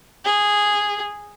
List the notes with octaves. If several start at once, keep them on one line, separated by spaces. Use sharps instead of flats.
G#4